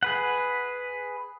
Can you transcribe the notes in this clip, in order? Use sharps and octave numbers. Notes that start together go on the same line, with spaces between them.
G#4 B4 F#5